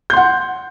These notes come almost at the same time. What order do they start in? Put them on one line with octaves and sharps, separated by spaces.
G6 C6 F#5